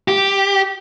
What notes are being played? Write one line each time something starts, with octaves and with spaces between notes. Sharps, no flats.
G4